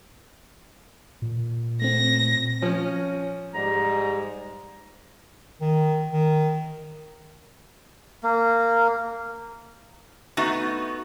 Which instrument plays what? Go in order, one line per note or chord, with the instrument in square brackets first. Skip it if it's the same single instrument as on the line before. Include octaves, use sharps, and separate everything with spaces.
[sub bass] A#2
[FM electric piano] A3 C4 [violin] A#6
[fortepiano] F3 [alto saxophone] C#4
[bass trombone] G#2 [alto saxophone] G3 [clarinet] A#5
[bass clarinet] D#3
D#3
[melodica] A#3
[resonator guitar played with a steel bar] A3 B3 D#4 F#4